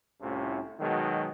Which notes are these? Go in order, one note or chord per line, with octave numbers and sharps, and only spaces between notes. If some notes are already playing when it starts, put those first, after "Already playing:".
C2 A2 C3 C#4 F4
B2 D#3 F#3 G#3